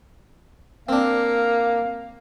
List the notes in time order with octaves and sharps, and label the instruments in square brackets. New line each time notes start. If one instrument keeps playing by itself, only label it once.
[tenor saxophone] A#3 [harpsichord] C4 D4 [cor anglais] F5